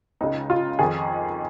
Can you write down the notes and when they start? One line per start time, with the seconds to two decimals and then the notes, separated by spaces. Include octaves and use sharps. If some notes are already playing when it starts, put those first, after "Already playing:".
0.21 C#2 C#3 D#4
0.50 F4
0.79 F2 D#3 G#4